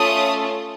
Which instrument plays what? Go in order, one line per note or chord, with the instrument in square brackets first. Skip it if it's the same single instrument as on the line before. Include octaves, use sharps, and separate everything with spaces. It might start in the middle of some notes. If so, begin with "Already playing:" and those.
Already playing: [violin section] A3 C#4 F4 D#6